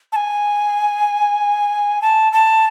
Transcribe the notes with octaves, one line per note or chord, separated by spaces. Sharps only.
A5
G#5
A5
A5